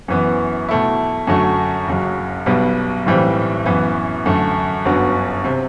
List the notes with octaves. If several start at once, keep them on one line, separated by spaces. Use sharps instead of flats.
F#2 E3 B3
B2 A3 E4
F#2 D3 F#3 A3
F#1 F#2 F#3
B1 B2 G3 B3
B1 A2 E3 G3 C4
F#2 E3 B3
F#2 D3 A3
G1 F#2 D3 F#3 B3
C3